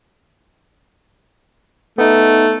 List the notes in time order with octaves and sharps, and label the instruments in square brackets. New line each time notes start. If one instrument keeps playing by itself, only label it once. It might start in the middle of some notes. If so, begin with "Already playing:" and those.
[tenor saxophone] A3 [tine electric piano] B3 D#4